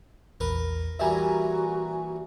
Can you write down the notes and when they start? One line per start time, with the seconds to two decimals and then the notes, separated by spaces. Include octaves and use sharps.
0.40 A#1 E2 A#4 B4
0.99 A#2 E3 G3 F#4 E5 G#5 A#5